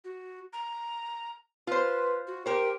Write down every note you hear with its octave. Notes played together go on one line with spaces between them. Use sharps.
F#4
A#5
F4 B4 C5
F#4
G4 A#4 C5 G5